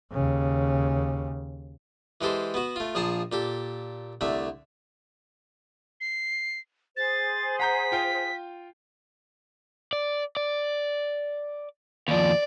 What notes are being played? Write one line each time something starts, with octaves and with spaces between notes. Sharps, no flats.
D#2 C#3
E3 G#3 G4 A4 C5
B3 F#4
A3 F4
A#1 F3 G#4 A5 A#5
A#2 G4 A4
C2 D3 A3 E5
C7
G#4 C5 A6
F#5 A#5 G6 B6
F4 G5
D5
D5
D#2 F3 D5